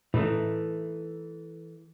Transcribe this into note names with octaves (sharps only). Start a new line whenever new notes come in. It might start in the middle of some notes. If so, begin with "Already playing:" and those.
A2 E3 A3 D#4